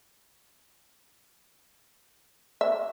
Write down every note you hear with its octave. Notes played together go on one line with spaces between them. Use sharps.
E5